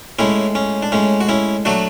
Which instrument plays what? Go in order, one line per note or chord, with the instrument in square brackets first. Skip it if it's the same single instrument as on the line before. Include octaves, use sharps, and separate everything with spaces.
[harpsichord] A2 G#3 C#4 E4
C#4
D4
A2 G#3 C#4
F#4
C#4 E4
F#3 A3 D4 F#4